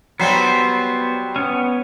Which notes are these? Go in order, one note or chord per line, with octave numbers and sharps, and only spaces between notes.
F#3 G3 B3 C5
B3 C#4